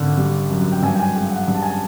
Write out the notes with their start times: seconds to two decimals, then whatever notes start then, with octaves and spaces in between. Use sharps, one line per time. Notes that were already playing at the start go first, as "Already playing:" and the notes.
Already playing: G#1 D3
0.17 G3
0.50 F#2
0.72 G5
0.82 G2 G#5
0.95 G5
1.00 G#5
1.15 G#3 G5
1.31 F#5
1.48 G2
1.55 A5
1.62 G#5
1.70 A5